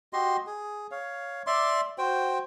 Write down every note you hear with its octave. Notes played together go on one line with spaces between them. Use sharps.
F#4 G4 D#5 C6
G#4
C#5 F5
D5 E5 C6 D6
F#4 C5 G5